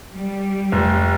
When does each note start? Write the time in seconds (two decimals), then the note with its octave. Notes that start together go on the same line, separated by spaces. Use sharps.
0.13 G3
0.72 F1